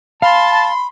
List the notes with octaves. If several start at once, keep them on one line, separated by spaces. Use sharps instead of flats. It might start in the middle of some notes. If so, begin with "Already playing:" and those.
F5 A5 B5 C6